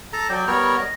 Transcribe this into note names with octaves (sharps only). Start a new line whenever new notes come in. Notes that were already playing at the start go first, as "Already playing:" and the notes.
A4 A5 A#5
F#3 D5 G5
G3 B3 A#4 C#5
D#5